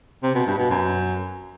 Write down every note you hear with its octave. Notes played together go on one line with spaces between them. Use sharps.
C3
B2
G2
B2
F#2